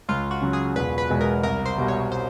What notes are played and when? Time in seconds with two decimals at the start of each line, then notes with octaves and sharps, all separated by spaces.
0.09 C#2 F4
0.31 F#4
0.42 C#3 F#3
0.53 G#4
0.76 E1 B4
0.98 B4
1.10 E2 B2 G#3 B3
1.21 A#4
1.43 C2 A#4
1.66 C5
1.78 B2 G3
1.88 C#5
2.12 C5